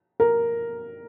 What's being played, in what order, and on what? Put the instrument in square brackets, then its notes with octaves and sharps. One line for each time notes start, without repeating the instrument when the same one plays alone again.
[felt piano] A#4